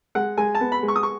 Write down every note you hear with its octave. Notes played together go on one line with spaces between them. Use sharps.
G#3 F#5
G#3 G#5
A5
B3
B5
G#3
C#6
D#6
C#6